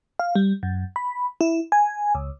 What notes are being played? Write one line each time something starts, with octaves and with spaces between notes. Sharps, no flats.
F5
G3
F#2
B5
E4
G#5
C#2